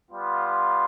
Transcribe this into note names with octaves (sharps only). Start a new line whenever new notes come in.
G3 B3 F4
C6